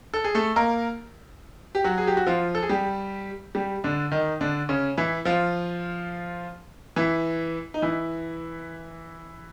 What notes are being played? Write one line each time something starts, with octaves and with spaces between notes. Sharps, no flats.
A4
G#4
A3 A4
A#3 A#4
G4
F#3 F#4
G#4
G4
F#4
F3 F4
A4
G#4
G3 G4
G3 G4
D3 D4
D#3 D#4
D3 D4
C#3 C#4
E3 E4
F3 F4
E3 E4
D#4
E3 E4